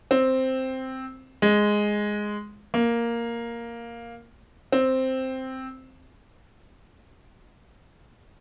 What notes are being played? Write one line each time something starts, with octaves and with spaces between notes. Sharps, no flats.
C4
G#3
A#3
C4